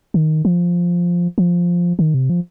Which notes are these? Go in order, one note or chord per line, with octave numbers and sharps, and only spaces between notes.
D#3
F3
F3
D#3
C3
F3